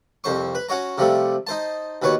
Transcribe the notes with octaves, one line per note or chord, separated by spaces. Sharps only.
C2 F2 C5 C#6
B4
C#4 F#4 C#5 A#5
C3 F3 G3 A3
D#4 C5 A5
D#2 B2 B4 C#5 C#6